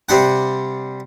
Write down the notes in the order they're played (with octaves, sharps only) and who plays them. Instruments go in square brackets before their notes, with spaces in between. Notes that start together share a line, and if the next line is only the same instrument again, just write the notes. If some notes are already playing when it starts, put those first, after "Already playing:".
[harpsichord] C3 G3 D4 F#5